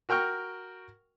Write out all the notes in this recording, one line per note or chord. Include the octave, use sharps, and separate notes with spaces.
F#4 A#4 G5 C#6 F6